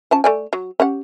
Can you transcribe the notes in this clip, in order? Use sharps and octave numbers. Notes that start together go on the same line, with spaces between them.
F3 C#4 A5
A3 D5 G#5
F#3
C#4 G4 F#5